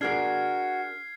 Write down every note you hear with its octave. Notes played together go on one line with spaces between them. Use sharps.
D4 F#4 G#4 A#4 F6 G#6 C7